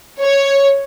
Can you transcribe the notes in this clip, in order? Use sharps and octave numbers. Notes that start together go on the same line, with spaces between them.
C#5